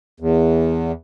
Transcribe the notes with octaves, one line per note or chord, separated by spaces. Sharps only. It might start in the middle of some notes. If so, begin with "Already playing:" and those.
E2